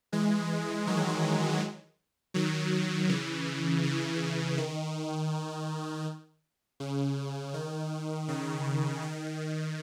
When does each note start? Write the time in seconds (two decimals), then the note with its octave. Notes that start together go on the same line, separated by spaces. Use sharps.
0.12 E3 G#3
0.87 D#3 F#3
2.34 D#3 F#3
3.09 C#3 E3
3.83 C#3
4.58 D#3
6.80 C#3
7.54 D#3
8.28 C#3
9.02 D#3